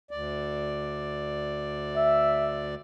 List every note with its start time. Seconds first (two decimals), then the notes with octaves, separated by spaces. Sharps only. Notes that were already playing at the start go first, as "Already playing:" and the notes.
0.11 D2 D5
1.97 E5